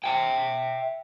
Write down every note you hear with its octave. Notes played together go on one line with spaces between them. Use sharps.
E5 G5